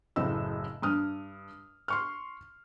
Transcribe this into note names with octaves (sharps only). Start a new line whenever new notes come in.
F#1 A2 C#3 D#5 E6
G2 D#6 F6
C6 C#6 F6